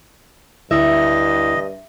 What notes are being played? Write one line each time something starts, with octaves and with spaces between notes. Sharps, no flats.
D2 G2 E4 D#5 E5